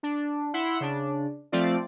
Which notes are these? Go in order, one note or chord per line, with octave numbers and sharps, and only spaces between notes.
D4
E4 F#5 B5 C6 E6
C#3 D4
F3 A3 C4 F4 D5